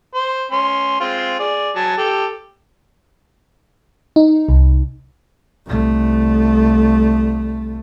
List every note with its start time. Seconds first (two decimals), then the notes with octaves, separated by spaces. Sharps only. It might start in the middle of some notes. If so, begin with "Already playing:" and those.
0.15 C5
0.51 C#4 C6
1.00 G#3 C4 F4
1.39 G#4 D5
1.76 F#3 G#5 A5
1.98 G4 A4
4.16 D#4
4.49 C2
5.66 C2 A3